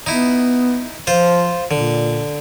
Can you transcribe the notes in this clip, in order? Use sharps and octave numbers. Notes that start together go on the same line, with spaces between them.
B3 D#4 E4
F3 F4 C5
A#2 D3